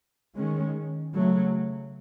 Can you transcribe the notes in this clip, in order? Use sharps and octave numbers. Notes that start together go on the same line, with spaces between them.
D#3 G#3 C#4
C#3 F#3 A3